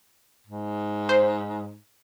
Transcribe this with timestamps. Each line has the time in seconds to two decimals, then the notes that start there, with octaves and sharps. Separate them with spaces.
0.47 G#2
1.09 C5